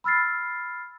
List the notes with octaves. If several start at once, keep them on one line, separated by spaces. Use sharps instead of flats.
B5 E6 F6 A6 C7